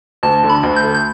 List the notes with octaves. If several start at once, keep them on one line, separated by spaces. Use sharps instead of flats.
D2 A5
D3
B5
D2
G6
A3
G6